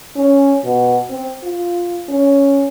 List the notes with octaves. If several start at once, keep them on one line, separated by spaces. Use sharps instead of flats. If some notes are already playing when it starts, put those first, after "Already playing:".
C#4
B2
C4
F4
C#4